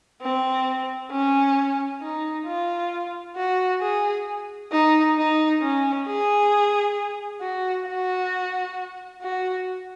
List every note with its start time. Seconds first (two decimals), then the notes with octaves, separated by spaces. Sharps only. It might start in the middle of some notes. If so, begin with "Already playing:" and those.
0.22 C4
1.11 C#4
2.02 D#4
2.46 F4
3.36 F#4
3.81 G#4
4.72 D#4
5.17 D#4
5.62 C#4
6.07 G#4
7.42 F#4
7.87 F#4
9.22 F#4